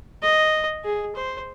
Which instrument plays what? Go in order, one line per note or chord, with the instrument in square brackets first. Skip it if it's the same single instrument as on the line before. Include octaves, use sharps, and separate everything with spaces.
[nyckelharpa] D#5
G#4
C5